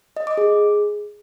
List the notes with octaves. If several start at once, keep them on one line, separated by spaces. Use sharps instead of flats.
D#5
D6
G#4